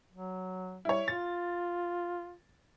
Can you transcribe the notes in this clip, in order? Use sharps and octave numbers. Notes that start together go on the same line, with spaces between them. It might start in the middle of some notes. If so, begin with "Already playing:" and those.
F#3
G3 E4 C#5
F4 A6